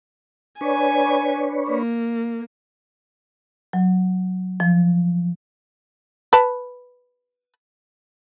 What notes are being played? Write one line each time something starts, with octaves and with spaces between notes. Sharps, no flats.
D4 B4 C#5 G#5
A#3
F#3
F3
B4 A5